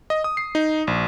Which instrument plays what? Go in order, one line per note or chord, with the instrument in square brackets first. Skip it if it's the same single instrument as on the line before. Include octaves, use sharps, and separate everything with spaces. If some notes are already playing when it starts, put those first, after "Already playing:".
[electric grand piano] D#5
D#6
C7
D#4
A#1